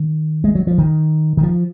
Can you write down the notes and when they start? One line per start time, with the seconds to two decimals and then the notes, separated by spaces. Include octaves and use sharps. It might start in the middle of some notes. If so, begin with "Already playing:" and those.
Already playing: D#3
0.44 G#3
0.55 F#3
0.67 F3
0.78 D#3
1.37 D#3
1.43 F3